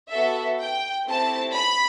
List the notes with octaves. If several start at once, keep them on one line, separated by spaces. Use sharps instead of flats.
B3 F#4 A4 E5
G5
A3 C4 E4 G4 A5
B5